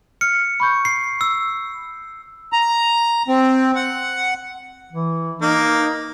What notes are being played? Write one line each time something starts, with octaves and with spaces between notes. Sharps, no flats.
F6 C#7
B5 C#6 G6
C7
E6
A#5
C4
F#5
E3
A#3 D#4